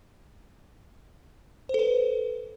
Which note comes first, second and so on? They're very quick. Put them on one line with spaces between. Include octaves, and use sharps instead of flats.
C5 A4 B4